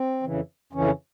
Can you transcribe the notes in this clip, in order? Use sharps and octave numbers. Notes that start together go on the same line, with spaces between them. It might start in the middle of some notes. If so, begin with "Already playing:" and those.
Already playing: C4
F2 C#3 E3
F2 C#3 E3 C#4